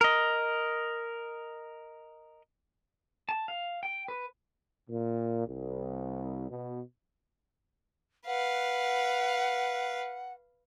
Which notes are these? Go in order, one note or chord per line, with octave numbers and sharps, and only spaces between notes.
A#4 D#5
A5
F5
G5
B4
A#2
C2
B2
B4 F5 F#5